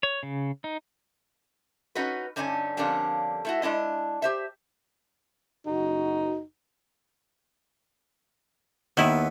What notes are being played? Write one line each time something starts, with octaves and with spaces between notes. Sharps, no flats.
C#5
C#3
D#4
C#4 D#4 F#4 B4
G2 D3 C#4 D#4 G#5
F2 D3 G3 A#3 C#4 D4
A3 E4 F#4
G#3 D4 E4 D#5
G4 C5 E5
F#1 D#4 F#4
D#2 D#3 B3 E4